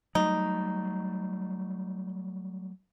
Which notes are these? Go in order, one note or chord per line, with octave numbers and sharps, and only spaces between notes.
F#3 G3 A3 D#4